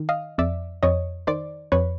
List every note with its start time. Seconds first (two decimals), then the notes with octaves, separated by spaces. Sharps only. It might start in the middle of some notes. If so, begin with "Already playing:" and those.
Already playing: D#3
0.09 D#5 F5
0.38 F2 D5 E5
0.83 F2 C#5 D#5
1.27 D#3 C5 D5
1.72 F2 B4 C#5